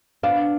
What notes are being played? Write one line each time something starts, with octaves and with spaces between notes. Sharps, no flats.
B3 D4 F5